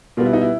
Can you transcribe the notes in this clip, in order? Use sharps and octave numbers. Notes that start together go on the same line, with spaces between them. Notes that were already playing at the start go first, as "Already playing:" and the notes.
B2 G3 B3 F4
E4
D#4
E4